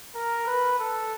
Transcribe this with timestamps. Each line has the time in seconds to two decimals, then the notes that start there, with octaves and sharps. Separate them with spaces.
0.15 A#4
0.47 B4
0.79 A4